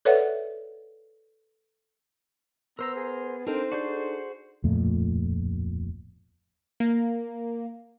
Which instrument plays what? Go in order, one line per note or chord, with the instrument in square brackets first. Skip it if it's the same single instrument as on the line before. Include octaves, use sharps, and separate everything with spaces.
[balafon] A4 B4 C#5 D5 E5 F#5
[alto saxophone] B3 [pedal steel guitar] A#4 C5 A#5 [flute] E6
[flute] G#4
[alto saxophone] C4 [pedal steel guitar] D4 A#4 [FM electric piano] D#4 A4 [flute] C5
[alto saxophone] D4 [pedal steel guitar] F#4 G#4 G6
[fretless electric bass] D1 F2 A#2 A3
[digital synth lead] A#3